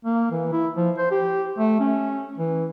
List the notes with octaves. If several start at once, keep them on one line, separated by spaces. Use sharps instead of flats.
A#3
E3
E4
F3
C5
G4
A3
C#4
E3